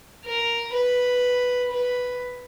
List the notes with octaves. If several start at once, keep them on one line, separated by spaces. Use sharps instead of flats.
A#4
B4
B4